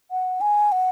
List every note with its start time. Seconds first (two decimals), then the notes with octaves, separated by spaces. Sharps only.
0.11 F#5
0.41 G#5
0.72 F#5